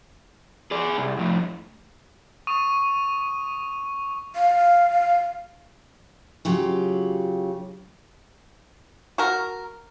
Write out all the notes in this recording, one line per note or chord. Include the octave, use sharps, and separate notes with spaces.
G#4 D5
C2
F2 A2
C#6 D#6 D#7
F5
C#3 F#3 F4 G4
F#4 A#4